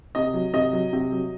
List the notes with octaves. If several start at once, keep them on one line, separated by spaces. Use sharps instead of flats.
C3 D#5
F#3
C3 D#5
F#3
C3
F#3